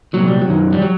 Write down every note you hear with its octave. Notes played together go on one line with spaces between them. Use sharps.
C2 A#2 F#3
G3
F#3
F#2 D#3
G3
F#3